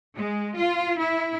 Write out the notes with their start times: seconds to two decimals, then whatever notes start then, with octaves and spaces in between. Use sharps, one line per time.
0.15 G#3
0.57 F4
0.99 E4